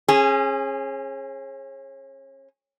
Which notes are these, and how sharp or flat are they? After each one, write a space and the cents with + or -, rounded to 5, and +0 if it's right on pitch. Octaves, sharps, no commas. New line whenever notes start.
C#4 -35 G#4 +0